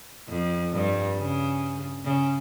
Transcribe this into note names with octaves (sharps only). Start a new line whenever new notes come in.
F2
G2
C#3
C#3